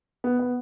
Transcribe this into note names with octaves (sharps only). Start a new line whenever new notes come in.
B3
B3